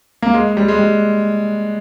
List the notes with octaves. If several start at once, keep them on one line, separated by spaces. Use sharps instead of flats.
A#3
G#3
G3
G#3
G3